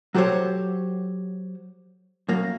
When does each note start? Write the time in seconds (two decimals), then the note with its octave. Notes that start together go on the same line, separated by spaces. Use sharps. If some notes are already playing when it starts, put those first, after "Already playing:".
0.14 F#3 F#4 G4 A4 C5 C#5
2.29 F#2 A#3